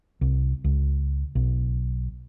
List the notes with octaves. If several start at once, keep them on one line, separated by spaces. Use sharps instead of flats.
C2
C#2
B1